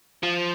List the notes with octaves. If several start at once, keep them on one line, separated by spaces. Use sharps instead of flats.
F3